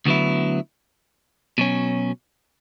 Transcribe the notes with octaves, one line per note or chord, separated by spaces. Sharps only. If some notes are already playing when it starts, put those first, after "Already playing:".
D2 D3 F#3 B3 E4
B2 F#3 C#4